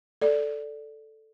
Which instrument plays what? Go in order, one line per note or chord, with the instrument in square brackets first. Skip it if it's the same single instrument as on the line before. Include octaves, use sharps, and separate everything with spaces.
[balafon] A4 D5